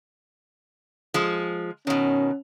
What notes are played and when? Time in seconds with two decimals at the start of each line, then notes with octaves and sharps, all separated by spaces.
1.14 F3 G#3
1.87 B2 D#3 C#4